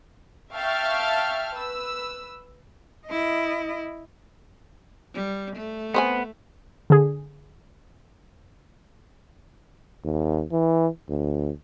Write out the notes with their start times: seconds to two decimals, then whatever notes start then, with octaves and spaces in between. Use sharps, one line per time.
0.52 E5 F5 G5 A5 C#6 F6
1.54 B4 E6
3.07 E4 D#5
5.15 G3
5.57 A3
5.94 B3 C4 C5 G#5
6.90 D3 G#4
10.05 D#2
10.52 E3
11.09 D2